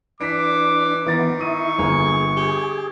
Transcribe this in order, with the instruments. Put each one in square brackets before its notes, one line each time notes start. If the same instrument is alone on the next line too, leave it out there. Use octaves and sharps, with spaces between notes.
[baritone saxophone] E3 [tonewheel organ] D4 [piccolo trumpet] D6 [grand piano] B6 D7
[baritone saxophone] D#3 [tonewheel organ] E3 B3 [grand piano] D6 A6 A#6
[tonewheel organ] E4 [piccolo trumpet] C#6 [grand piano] D#6 D#7
[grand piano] G1 [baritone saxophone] A#3 [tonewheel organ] G#4
[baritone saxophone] G4 [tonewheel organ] G#4